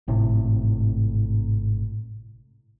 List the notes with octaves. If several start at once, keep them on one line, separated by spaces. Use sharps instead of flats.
G#1 A2 C3